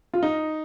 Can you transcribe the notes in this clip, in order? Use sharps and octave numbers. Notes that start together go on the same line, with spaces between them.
F4
D#4